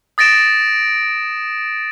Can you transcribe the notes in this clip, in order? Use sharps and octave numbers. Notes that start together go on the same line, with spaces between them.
D#6 A6 A#6 D7 E7